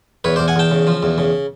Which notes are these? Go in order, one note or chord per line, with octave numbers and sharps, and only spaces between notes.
E2 B4 C#5
C5 D5
E2
F#5 G#5
E2 G5 A5
C#3
F3
E2
C#3